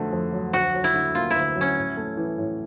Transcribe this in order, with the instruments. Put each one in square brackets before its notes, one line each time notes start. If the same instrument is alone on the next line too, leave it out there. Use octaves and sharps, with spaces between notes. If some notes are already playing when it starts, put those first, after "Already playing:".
Already playing: [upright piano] F2 D3 F#3 A3
F2
F#3
[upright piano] D2 [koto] F#4
[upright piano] F#3
[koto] E4
[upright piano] D3
[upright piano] A#3 [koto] F4
[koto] E4
[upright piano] D2
F#3
[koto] C#4
[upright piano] A2
A3
E3
A2